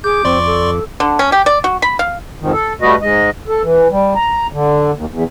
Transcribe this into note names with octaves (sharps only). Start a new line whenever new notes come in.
G#4 D6 G6
F2 C4 D5 C6 C#6
A4
D3
C#4
G4
D5
F#4
B5
F5
F2 G#2 D#3
A4
G3 A3 F#4 B4 D#5
G#2 G#3 D#5
A4
E3
G3
A#5
D3
D#2
E2